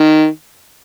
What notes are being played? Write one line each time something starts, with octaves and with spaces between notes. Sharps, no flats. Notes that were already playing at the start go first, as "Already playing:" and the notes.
Already playing: D#3